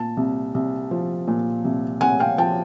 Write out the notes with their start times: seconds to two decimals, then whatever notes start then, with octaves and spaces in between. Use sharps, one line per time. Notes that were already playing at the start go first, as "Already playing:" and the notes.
Already playing: A#2 A5
0.17 C2
0.54 C2
0.91 F3
1.27 A#2
1.65 C2
2.01 C2 F#5 G#5
2.20 F5 G5
2.38 F3 G5 A5